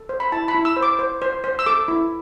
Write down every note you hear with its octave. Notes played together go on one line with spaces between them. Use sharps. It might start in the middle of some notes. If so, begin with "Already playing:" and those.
Already playing: A4
C5
B5
E4 A5
B5
E4
E6
C5
D6
C5
C5
C5
E6
A4 D6
E4